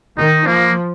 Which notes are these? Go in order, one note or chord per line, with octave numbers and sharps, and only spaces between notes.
D#3 D#4
F3 A#3